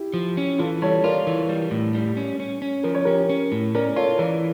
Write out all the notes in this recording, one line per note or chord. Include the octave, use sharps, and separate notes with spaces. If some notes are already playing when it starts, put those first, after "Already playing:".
Already playing: E4 G4
F3
C#4
E3 F4 A4
G3 A4 C#5
F4 A#4 D5
E3
G3
A2
G3
C#4
C#4
C#4
F3 A#4
C#5
C#4 G4 A#4
C#4
A2
C#4 A#4 D5
F4 A4 C#5
E3 A#4 D5